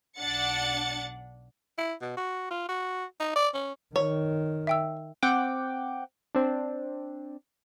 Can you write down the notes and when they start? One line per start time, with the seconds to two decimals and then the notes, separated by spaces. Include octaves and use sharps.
0.18 B1 D4 F#5 A6 C#7
1.78 E4
2.02 B2
2.17 F#4
2.51 F4
2.69 F#4
3.20 D#4
3.36 D5
3.54 C#4
3.96 D#3 C#5
4.67 E5 G5 E6
5.22 C4 F#5 G5 D6
6.35 C4 D4